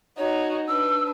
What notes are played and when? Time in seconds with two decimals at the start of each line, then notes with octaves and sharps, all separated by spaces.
0.18 D#4 F#4 C#5
0.67 D4 B4 E6